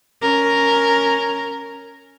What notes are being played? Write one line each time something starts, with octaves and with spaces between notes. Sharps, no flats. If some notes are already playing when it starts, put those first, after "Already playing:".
C#4 A#4